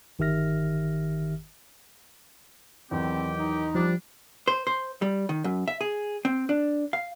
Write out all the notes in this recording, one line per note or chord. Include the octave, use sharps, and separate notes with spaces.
G1 D#3 G4 E5 F6 A#6
E2 D#3 F#3 C4 G4
D#4
F3 G3 D4
C5
C5
G3
D#3
F#2
E5
G#4
C4
D4
F5